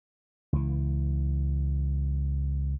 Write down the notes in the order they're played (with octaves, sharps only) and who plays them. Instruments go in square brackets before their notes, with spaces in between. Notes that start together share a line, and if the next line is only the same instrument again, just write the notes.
[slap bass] C#2 E3